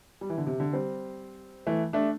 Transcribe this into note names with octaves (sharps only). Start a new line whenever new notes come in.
G3
E3
D3
C3
D3
G3 C4
E3 A3
A3 D4